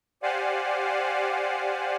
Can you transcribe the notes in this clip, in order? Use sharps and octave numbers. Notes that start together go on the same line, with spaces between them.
G4 C5 D5 F5 F#5 G#5